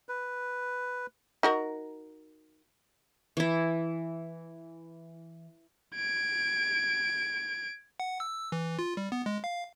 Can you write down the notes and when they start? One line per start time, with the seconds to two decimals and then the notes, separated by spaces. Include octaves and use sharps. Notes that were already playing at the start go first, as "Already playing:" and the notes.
0.09 B4
1.43 D#4 F#4 A#4
3.37 E3 E4
5.95 G#6 D7
8.00 F#5
8.20 E6
8.52 E3
8.79 F4
8.97 G3
9.12 B3
9.26 G#3
9.44 F5